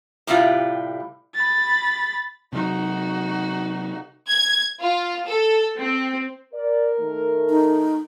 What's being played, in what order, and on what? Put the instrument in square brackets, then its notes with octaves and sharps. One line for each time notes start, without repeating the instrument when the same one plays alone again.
[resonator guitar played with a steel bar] A2 C3 G3 E4 F4
[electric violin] B5 A6
[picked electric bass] C3 F#3 [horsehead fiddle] D#4 F#4
[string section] G#6
F4
A4
C4
[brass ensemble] A#4 [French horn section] D5
[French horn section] D#3 A3
[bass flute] D#4